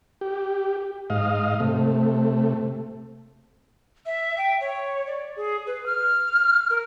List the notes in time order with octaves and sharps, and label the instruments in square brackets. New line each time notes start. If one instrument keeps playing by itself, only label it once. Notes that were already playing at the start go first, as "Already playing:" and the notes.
[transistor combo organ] G4
G#2 D#5 F5
C3 A3
[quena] E5
G5
C#5
D5
G#4
B4
F6
A#4